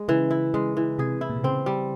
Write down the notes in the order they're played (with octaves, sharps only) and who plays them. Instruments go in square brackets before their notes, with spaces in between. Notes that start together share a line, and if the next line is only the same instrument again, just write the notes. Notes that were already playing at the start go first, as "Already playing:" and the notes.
Already playing: [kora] G#3
[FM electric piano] C#3 [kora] E3
[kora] E4
[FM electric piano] C#3 [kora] G#3
[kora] E3
[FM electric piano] C3 [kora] G#4
[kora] E4
[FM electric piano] A#2
C3
[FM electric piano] C#3 [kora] C4
[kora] G3